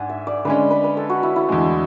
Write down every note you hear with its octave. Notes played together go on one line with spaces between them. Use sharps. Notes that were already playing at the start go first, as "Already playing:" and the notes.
Already playing: G#2 D4 F#5 G#5
E5
D5
D3 G#3 C#4 B4
B4
B4
A4
F#4
E4
E4
E2 D3 G#3